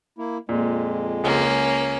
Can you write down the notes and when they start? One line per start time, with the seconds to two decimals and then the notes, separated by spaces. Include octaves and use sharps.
0.18 A#3 E4
0.49 F2 A#2 G#3
1.24 C#2 A#3 C#4